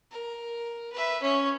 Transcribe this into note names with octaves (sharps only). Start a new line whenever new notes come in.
A#4
B4 E5
C#4 C#5